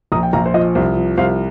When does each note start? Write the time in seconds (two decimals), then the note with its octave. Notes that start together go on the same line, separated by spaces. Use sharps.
0.12 A#1 A#5 D#6
0.23 G5
0.33 A#1 F5 A#5
0.46 C5
0.54 F3 D#5
0.75 C2 C5
0.96 F3
1.18 C2 C5 F5